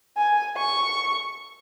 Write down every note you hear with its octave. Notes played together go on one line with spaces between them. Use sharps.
G#5
C#6